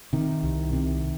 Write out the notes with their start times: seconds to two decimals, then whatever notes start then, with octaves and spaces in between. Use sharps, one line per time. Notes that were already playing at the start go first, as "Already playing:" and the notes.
0.13 C3 D#3
0.43 C2
0.73 C3